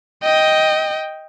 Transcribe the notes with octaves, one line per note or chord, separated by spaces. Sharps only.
D#5 G5